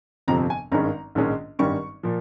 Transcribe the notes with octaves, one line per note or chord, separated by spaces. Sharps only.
G1 F2 C3 F3 C4 A#5
G#5
G#1 G2 D#3 G#3 C#4 A#5
A#1 G#2 D#3 G#3 C#4
G#1 G2 D#3 G3 C#4 C#6
A#2 F3